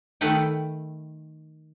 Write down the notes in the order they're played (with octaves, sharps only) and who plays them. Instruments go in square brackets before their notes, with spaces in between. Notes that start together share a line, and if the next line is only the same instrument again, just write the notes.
[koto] D#3 A3 A4 B4 F#5 G5